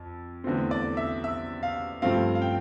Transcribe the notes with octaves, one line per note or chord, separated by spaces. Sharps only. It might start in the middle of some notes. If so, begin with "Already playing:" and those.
Already playing: F2
E2 D3 A3 C4
D5
E5
E5
F5
G2 F3 A3 C4 F5
F5
G5